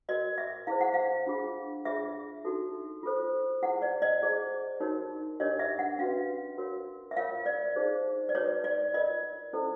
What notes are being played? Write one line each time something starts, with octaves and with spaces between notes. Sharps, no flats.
F#4 A#4 C#5 D#5
E5
E4 G#4 C5 F5
F#5
F5
D4 F4 G#4
F4 G#4 C#5 E5
D#4 F#4 A4
F4 A4 C5
E4 G#4 C5 F#5
D5
D#5
E4 G#4 C5
D#4 F#4 A#4 C#5
D4 G4 A#4 C#5 D#5
E5
F#5
C#4 F#4 B4 F5
F#4 A#4 C#5
E5
F4 A#4 C#5 F5
D5
D#4 G#4 C5
D5
D#4 F#4 B4 C#5
D5
F4 A#4 C#5 D#5
C#4 E4 A4 C5